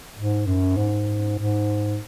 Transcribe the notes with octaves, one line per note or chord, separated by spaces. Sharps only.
G#2
F#2
G#2
G#2